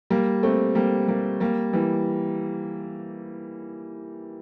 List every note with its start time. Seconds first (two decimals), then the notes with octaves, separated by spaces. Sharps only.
0.10 G3 A#3
0.43 A3 C4
0.75 G3 A#3
1.08 G3 A#3
1.40 G3 A#3
1.73 E3 G3